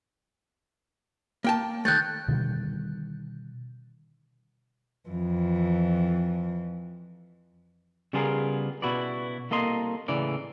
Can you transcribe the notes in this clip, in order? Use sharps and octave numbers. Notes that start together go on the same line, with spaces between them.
A#3 G5 A5
D#3 A3 F#6 G6 A6
B2 D3 D#3 G3
F2 E3
C#3 G3 B3 F4 G#4 A#4
B2 E4 F#4 B4 D5
C2 A#3 A4 D#5 C6
A2 C#3 E3 D5